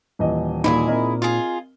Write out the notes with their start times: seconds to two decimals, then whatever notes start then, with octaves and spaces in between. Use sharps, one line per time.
0.19 D#1 E3 D#5
0.64 A#2 D#4 E4 G4 G#4
0.88 C4 A#4 D#5
1.22 F4 G#4